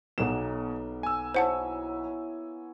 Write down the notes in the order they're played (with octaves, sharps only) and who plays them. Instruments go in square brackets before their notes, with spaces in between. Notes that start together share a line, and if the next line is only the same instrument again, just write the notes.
[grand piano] B1 E7 [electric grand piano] B2 [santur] A#3 B3
[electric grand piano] G#5 E6
[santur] E4 F#4 C#5 [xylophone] C5 F#5 A5